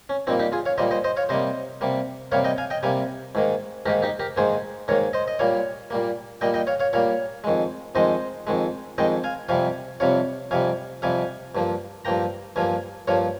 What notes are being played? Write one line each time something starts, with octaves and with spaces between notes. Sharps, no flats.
C#4
A#2 G3 A#3 C4 D#4
D#4 G4
F4 G#4
C#5 F5
A#2 G3 A#3 C5 D#5
C5 D#5
C5 D#5
C#5 F5
C3 G3 A#3 C5 D#5
C3 G3 A#3
C3 G3 A#3 C#5 F5
D#5 G5
F5 G#5
D#5 G5
C3 G3 A#3 F5 G#5
G#2 D#3 A#3
G#2 D#3 A#3 G4 A#4
D#4 G4
G4 A#4
G#2 D#3 A#3 G#4 C5
G#2 D#3 A#3 A#4 C#5
C5 D#5
D#5
A#2 G3 A#3 C#5 F5
A#2 G3 A#3
A#2 G3 A#3 D#5 G5
D#5 G5
C#5 F5
C#5 F5
A#2 G3 A#3 C#5 F5
F2 D#3 G#3
F2 D#3 G#3 C5 D#5
F2 D#3 G#3
F2 D#3 G#3 D#5 G5
F5 G#5
F2 C3 G3 F5 G#5
F2 C3 G3 C#5 F5
F2 C3 G3 F5 G#5
F2 C3 G3 F5 G#5
G2 F3 A#3
G2 F3 A#3 G5 A#5
G2 F3 A#3 F5 G#5
G2 F3 A#3 C#5 F5